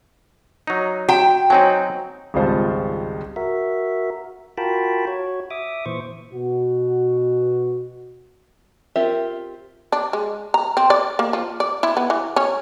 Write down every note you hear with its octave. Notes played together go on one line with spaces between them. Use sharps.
F#3 D#4
F#4 F#5 G5 A#5
F#3 C4 D#4 C#5 G#5
G#1 C#2 G3 F4 C5 A5
F#4 A#4 E5
F4 F#4 A#4 G5 A5 B5
F#4 C#5
E5 D6 D#6
A#2 E3 C5 C#6
B2 F#4
C4 F4 G4 A#4 E5
D4
G#3
A#5
C4
D5
A#3
F3
D5
E4
B3
E3
C#4